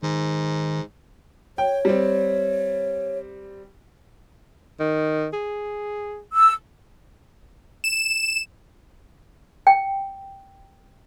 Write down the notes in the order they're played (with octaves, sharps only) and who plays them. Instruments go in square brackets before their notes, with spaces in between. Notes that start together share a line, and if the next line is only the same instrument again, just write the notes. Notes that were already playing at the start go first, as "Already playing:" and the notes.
[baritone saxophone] G#2 [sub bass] D#3
[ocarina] C#5 [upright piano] G5
[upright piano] G3 C4
[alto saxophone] D#3
G#4
[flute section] E6
[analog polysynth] E7
[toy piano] G5